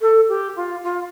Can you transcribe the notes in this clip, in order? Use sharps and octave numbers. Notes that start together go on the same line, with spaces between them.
A4
G4
F4
F4